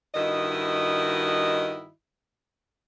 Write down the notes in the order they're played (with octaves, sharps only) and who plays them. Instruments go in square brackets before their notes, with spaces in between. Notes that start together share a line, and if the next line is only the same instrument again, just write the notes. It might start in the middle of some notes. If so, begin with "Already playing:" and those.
[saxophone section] G2 D#3 E4 F#4 D#5